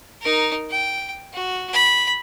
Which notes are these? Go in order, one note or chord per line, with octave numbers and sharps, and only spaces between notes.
D#4 A#4
G5
F#4
B5